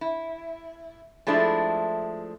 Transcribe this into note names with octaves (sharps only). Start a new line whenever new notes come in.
E4
F3 G#3 A3 D4 E4